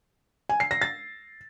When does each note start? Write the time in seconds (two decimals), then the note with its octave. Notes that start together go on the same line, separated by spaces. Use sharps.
0.49 G#5
0.60 C7
0.71 A#6
0.82 A6